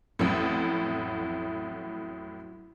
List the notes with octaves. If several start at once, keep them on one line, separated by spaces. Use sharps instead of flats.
A1 F2 A2 F#3 E4